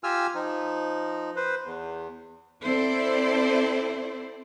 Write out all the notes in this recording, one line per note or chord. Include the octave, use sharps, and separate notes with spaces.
F4 G4 G#5 E6 F6
F3 D#4
B4 C5
E2
C4 E4 A4 C5 D5